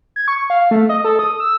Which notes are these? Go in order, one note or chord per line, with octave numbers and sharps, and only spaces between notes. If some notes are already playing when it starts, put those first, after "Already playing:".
G#6
C#6
F5
A3
D#5
A4
D#6
E6